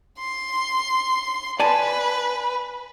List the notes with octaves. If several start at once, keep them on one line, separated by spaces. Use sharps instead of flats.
C6
B4 D5 G#5 A5